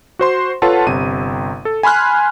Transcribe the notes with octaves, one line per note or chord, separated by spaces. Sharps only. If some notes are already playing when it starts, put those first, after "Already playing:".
F#4 C5 C6
F4 A4 B4 C#5 F#5 A5
G1 C3 D#7
A4
G#5 B5 C6 F6 F#6